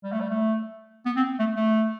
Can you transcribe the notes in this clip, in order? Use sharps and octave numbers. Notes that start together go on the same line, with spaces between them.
G3
A3
G3
A3
B3
C4
A3
A3